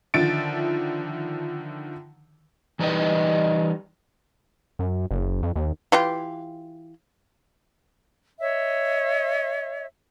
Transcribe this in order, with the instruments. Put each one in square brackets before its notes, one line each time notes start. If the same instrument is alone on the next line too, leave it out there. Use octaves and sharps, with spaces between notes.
[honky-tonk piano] D3 D#3 F3 E5 A6 D7
[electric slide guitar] E3 G3 D#4 B4 D#5 G5
[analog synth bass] F#2
F#1
F2
D#2
[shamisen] E3 F4 G4
[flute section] C#5 D#5 E5